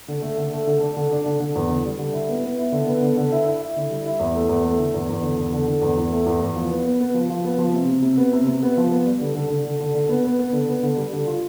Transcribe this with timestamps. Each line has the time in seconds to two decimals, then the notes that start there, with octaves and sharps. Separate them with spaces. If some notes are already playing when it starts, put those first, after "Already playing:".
0.08 D3
0.22 A3
0.38 D3
0.52 A3
0.67 D3
0.81 D4
0.97 D3
1.11 D4
1.26 D3
1.40 D3
1.55 E2
1.69 D3
1.85 G3
1.99 D3
2.13 E4
2.29 B3
2.44 B3
2.59 E4
2.72 D3
2.87 B3
3.02 D3
3.17 D3
3.32 E4
3.46 E4
3.62 E4
3.76 D3
3.90 G3
4.06 E4
4.19 E2
4.35 A3
4.49 E2
4.65 A3
4.78 D3
4.94 E2
5.09 E2
5.23 D3
5.38 E2
5.53 D3
5.68 D3
5.82 E2
5.97 E2
6.11 A3
6.26 E2
6.41 E2
6.55 F3
6.70 B3
6.85 B3
7.00 B3
7.14 F3
7.30 F3
7.45 B3
7.58 F3
7.73 C3
7.88 C3
8.02 C3
8.17 B3
8.33 C3
8.47 C3
8.62 B3
8.77 F3
8.91 B3
9.06 G3
9.21 D3
9.35 D3
9.50 D3
9.65 D3
9.80 D3
9.95 D3
10.09 B3
10.24 B3
10.39 B3
10.53 D3
10.69 B3
10.83 D3
10.97 G3
11.13 D3
11.27 F4